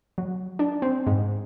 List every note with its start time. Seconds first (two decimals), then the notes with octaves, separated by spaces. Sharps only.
0.18 F#3
0.59 D4
0.82 C4
1.07 G#2